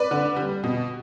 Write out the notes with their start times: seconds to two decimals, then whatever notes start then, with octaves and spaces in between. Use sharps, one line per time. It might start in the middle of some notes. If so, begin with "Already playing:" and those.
Already playing: B4 D5
0.11 D3
0.37 G3
0.64 B2